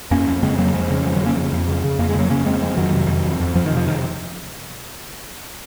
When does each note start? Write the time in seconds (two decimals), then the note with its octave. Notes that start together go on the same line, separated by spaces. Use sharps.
0.11 F2 A#3 C#4
0.28 F2
0.43 C#3 G#3 C4
0.58 F2 F#3 A#3
0.74 F2 F3 G#3
0.90 C#3
1.05 F2 F3 G#3
1.16 D#3 F#3
1.21 C#3
1.26 A#3 C#4
1.36 F2
1.52 F2
1.68 C#3
1.84 C#3
1.99 F2 A#3
2.09 G#3
2.15 C#3 F#3 A#3
2.30 C#3 A#3 C#4
2.46 F2 G#3 C4
2.61 F2 F3 G#3
2.77 F2 D#3 F#3
2.93 C3
3.08 F2
3.24 F2
3.40 F2
3.55 F2 F3
3.66 D#3
3.71 C3
3.77 F3
3.87 D#3